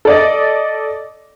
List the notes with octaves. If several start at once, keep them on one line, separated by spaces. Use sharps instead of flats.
A4 D5 D#5